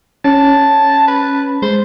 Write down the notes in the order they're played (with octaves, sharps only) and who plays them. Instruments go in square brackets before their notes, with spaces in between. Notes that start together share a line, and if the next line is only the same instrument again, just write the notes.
[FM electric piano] C#4 [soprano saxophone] A5
[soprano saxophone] B4
[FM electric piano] G#3 [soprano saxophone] C5